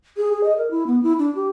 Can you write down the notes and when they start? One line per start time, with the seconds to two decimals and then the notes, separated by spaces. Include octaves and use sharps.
0.17 G#4
0.32 G#4
0.44 D#5
0.58 A#4
0.71 E4
0.87 B3
1.03 E4
1.19 D4
1.35 G4